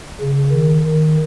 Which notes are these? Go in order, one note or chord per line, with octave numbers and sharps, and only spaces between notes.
C#3
D#3
D#3